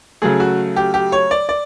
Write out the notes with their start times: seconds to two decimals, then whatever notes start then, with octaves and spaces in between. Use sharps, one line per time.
0.22 C#3 F#3 A3 G#4
0.40 F#4
0.76 G4
0.94 G4
1.12 C#5
1.31 D5
1.49 D5